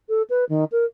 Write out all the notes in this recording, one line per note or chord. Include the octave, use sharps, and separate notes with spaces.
A4
B4
D#3
A#4